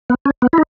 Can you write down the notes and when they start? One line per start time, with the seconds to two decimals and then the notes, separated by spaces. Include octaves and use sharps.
0.10 B3
0.26 C#4
0.42 B3
0.53 E4
0.58 D#4